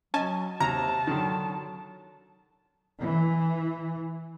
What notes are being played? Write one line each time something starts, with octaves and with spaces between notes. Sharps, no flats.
F#3 C#4 D#5 G#5 A5 C#6
D#2 C3 A5 A#5
D3 D#3 F#3
E3